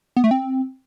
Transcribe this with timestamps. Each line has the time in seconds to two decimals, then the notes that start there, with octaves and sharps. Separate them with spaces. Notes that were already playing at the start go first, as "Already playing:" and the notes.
0.17 B3
0.24 A3
0.31 C4